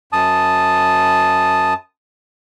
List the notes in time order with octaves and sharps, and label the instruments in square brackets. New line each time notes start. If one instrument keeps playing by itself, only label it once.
[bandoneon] F#2 A5 D#6